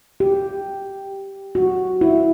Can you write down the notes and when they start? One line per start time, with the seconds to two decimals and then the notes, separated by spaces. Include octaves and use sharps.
0.20 G4
1.55 F#4
2.01 E4